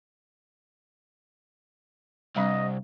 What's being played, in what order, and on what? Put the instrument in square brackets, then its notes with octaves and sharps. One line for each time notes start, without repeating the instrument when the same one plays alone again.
[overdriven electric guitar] C2 [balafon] G3 C4 D4 [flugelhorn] D#5